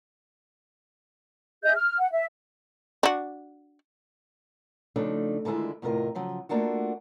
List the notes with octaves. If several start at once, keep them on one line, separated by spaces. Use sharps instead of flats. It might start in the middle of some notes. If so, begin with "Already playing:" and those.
G#4 D#5 E5 G6
F6
F#5
E5
D4 F#4
C#3 F3 A3 C4 D4 D#4
D3 D#3 G#3 E4 F4
E2 A2 C3 F4 A#4 D#5
C#3 F3 F#3
A3 A#3 D4 F4 F#4